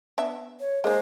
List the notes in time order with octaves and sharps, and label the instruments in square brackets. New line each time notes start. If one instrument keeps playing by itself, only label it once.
[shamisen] B3 D4 E5
[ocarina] C#5
[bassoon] G#3 [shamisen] A#3 D#4 [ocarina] C5